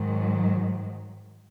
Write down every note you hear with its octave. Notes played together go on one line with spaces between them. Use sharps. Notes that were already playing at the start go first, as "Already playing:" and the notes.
Already playing: G#2 D#3 F#3